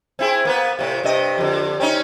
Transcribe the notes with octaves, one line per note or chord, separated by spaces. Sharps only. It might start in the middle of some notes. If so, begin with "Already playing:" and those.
C4 E4 G#4
A#3 B3 B4
A2 C3
G2 C3 D#5
F2 D3
C4 C#4 D#4